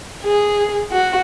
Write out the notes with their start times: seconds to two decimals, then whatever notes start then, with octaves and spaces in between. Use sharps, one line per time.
0.23 G#4
0.92 F#4